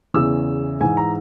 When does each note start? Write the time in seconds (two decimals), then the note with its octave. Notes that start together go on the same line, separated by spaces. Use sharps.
0.14 E2 C#3 E3 E6
0.80 G#2 E3 G#5
0.97 A#5